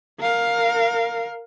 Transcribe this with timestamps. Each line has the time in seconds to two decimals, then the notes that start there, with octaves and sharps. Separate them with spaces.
0.20 A#4 F5